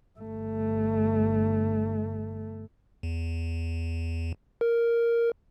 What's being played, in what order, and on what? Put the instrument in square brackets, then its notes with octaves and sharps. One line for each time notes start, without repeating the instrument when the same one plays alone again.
[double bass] G1 A3
[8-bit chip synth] E2
A#4